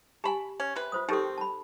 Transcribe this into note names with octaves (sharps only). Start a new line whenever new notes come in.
G4 G#5 A5 B5
C#4
C3 B4
F4 C5 D#6
D#3 C4 D#4 G4 A4
A5 B5